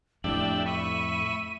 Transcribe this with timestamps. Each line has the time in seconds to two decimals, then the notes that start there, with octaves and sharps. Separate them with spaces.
0.24 F2 A2 D4 G4 E5 F#7
0.66 E5 B5 C#6 D#7